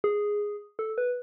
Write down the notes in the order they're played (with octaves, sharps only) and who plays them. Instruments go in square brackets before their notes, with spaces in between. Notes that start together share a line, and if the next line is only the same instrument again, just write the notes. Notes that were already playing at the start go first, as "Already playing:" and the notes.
[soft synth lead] G#4
A4
B4